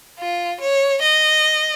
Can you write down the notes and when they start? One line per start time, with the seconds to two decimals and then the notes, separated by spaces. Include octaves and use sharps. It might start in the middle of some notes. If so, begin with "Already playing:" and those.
0.19 F4
0.61 C#5
1.02 D#5